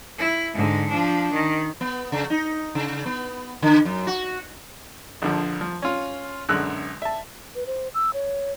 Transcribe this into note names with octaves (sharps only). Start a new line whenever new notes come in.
E4
G#2 D3
F3 D4
D#3
B3
C#3
D#4
C#3
B3
D3
F#2
F#4
A#1 D3 F3
F3
C#4 F4
B1 F#2 D3 G#3 E6 F#6
E5 A5
B4
C5
E6
C#5